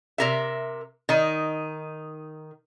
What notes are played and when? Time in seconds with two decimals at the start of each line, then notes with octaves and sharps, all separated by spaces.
0.18 C3 A#4 E5
1.09 D#3 D#4